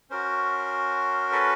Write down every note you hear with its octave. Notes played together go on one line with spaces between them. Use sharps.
C#4 F#4 A#4 C5
A4 B4